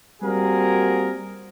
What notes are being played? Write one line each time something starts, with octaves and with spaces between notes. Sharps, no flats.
G3 A#3 C4 F#4 G#4 A#4